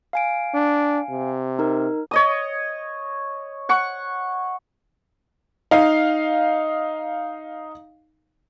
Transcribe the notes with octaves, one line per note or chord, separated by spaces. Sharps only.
F5 G#5 D7
D4
C3
D#4 A#4
C#5 D#5 D#6
F#5 C#6
D#4 F5